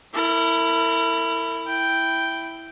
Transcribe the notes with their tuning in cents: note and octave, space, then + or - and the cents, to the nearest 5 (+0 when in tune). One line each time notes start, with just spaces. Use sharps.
E4 +0 A#4 -40
E4 +0 G5 -5